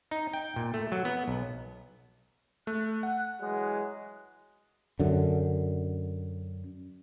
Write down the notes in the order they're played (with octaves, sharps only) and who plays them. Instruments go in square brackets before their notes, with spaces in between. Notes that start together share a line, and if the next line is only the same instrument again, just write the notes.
[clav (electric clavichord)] D#4
G5
A#2
A3
F#3
B3
B1
[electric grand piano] A3 [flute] F#6
[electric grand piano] F#5
[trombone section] E3 F#3 G#3
[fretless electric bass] F#2 D3